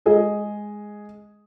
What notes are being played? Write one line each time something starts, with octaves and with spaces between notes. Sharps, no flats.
G#3 G#4 D#5